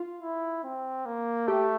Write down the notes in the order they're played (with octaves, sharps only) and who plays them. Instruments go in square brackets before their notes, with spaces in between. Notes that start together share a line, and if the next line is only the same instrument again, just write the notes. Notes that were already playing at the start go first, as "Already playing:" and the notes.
Already playing: [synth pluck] F4
[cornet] E4
C4
A#3
[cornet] A3 [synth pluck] G4